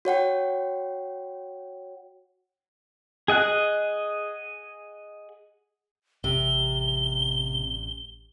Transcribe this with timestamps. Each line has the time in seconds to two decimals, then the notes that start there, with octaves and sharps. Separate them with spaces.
0.05 F#4 C#5 F#5 G5
3.28 G#4 D#5 F#5 F#6
6.24 A1 C3 G7